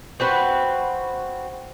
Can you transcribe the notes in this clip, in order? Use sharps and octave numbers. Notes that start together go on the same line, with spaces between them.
C4 F#4 B4